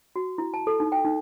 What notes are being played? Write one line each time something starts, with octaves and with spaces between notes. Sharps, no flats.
F#4
E4
A5
A4
D#4
G5
D#4